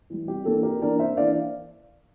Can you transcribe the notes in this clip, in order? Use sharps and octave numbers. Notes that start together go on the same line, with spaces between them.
E3 G3
C3 G4
E3 A#3 D4 A4
C3 G4 A#4
E3 A#3 D4 A#4 D5
C3 C5 E5
E3 A#3 D4 D5 F5